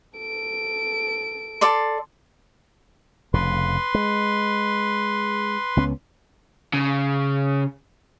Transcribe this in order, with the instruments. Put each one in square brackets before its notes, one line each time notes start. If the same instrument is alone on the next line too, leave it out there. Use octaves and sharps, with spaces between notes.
[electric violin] A4 D7
[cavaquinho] A4 D5 C6
[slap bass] F1 F2 C#3 [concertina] B4 C6
[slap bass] G#3
C#2 B3 C#4
[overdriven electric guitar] C#3